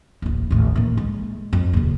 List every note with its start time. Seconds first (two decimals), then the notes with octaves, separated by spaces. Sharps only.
0.22 D#1 A1
0.51 A1 D#2
0.75 A#2 E3
0.97 G#3
1.53 F2
1.73 D#1 C#3